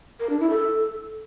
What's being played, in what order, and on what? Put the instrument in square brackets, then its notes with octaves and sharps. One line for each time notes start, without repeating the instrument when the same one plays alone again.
[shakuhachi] A#4
D4
E4
A4